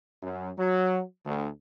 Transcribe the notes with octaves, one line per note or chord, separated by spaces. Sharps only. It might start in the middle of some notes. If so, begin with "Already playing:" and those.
F#2
F#3
D2